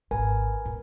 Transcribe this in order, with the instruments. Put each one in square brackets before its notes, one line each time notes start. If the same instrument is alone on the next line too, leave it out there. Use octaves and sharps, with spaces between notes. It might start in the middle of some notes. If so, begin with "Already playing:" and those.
[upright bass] G#1 [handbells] A#4 B4 G#5
[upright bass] A2